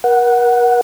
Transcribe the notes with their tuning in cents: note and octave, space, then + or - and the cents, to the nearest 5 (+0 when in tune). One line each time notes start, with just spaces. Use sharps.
A#4 +35 F#5 +0